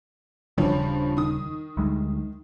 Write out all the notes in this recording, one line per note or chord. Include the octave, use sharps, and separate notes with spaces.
D#1 G2 C#3 F3 G3 C#4
D#3 D#6
D2 G3 G#3